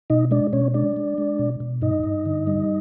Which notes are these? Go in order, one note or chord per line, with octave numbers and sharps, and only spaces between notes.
B2 D#4 D#5
G#3 D4 D5
B2 C#4 C#5
G#3 D4 D5
G#3
G#3
B2
B2
G2 D#4 D#5
G2
D3
G3